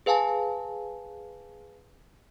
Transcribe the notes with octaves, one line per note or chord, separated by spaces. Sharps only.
G#4 B4 F5 G#5 A5